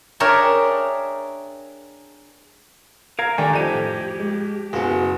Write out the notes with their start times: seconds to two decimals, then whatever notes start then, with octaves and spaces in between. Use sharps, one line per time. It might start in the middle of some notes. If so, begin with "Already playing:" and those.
0.20 D4 G#4 A#4 C#5 E5 G5
3.19 A#4 F5 A#5 G#6
3.38 D#3 A3 D4 G4 G#5 A#5
3.53 F2 D#4 G4 A4 D#7
3.74 A2
4.20 G#3
4.73 F#1 B3 F#4 G#4